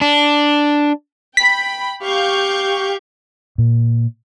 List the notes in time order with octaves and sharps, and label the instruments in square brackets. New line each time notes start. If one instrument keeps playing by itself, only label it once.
[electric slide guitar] D4
[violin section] G5 B5 [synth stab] B6
[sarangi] G4 [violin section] F5 C#6 G6
[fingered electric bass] A#2